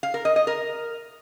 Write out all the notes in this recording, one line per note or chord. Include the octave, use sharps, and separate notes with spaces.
F5
A#4
D#5
D#5
A#4